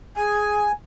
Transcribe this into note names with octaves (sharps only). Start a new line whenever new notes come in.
G#4 G#5